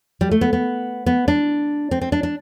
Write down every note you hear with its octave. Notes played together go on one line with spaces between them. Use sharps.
G3
A3
B3
B3
B3
D4
C4
C4
D4
D4